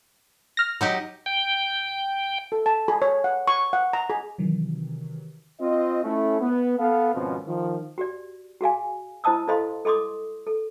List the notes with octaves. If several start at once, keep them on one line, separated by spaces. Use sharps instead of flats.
F6 A#6
F#3 D#4 G4
G5
A4
A5
G#4
C#5
F#5
C#6
F#5
A#5
G#4
C3 D#3 E3 F#3
C4 F4 D#5
A3 C#4 E4
B3
B3 A4 F5
G#1 B2 F3 C4 C#4
D#3 F3
F#4 G4 D5
F#4 G#4 F5 G#5
E4 C5 D#5 A5 D#6 E6
E4 A4 C5 D#5 F5 C6
A4 D#5 C6 D6 D#6
A4